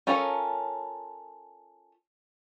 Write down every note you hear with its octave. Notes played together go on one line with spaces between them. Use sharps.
C#4 F4 A4 A#4 C#5